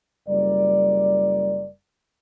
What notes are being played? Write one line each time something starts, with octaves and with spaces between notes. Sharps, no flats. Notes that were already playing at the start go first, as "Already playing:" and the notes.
F#1 G3 A#4 D5